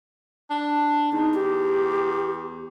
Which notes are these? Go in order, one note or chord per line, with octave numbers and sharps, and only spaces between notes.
D4
E2 D#4
G4